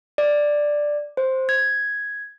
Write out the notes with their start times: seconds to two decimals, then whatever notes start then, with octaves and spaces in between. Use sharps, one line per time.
0.18 D5
1.17 C5
1.49 G#6